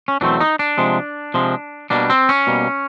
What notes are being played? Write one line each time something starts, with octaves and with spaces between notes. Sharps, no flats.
C#4
E2 B2 F#3 A3 C4 D4
D#4
D4
C3 F3 G#3
C3 F3 G#3
B2 G3 A#3 D4
C4
C#4
B2 G3 A#3